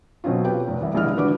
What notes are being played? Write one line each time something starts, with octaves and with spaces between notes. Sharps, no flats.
B2 F#3 C4 C#4 F4
G4 B4 G5
F1
C2 E3 G3
D#1 A#1 G#3 E4 F6
G#1 D3 F#4 B4 D6